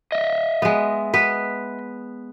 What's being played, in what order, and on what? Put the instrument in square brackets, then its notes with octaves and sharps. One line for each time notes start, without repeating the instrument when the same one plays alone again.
[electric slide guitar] D#5 E5
[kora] G#3 B3
B3 B4